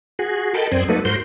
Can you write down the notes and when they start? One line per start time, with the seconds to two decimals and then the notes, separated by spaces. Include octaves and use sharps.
0.19 F#4 G#4
0.54 A4 A#4 D#5 G5 A5 B5
0.71 F#2 C4 C5 D5 D#6 G#6
0.88 F#3 A3 A#3 D#4 A4 B4
1.05 G#2 F#4 A#4 C5 C6 G6